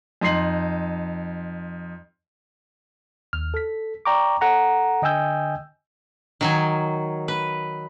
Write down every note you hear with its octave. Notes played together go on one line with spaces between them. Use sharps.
F2 D#4 C6 C7 F#7
D#2 F6
A4 B6
D5 G5 A#5 C#6 D6
A4 F#5 A#5
D3 D#5 G5 G#5 E6 G6
D#3 F#3 G#5
B4